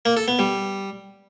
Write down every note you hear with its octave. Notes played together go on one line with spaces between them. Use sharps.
A#3
A4
B3
G3